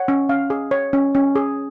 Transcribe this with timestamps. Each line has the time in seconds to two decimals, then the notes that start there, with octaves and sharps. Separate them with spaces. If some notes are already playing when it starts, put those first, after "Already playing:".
Already playing: C#5 F#5
0.08 C#4
0.29 C#4 F5
0.50 G#4
0.71 C#5
0.93 C#4
1.15 C#4
1.36 G#4